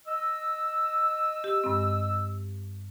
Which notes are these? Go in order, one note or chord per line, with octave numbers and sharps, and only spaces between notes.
D#5 E6
G4
G2 G#3 C4